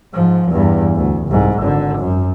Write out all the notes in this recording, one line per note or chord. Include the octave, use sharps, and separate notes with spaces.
G#2 F3
E2 G2
D2
C2 G#2
G#1 D3
F#2